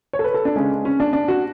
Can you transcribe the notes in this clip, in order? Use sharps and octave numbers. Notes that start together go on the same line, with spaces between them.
C#5
A4
B4
A4
D4
C#3 G#3 C#4
C#4
D4
D4
F#4